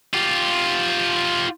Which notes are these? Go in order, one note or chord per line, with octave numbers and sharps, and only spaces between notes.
F4 G4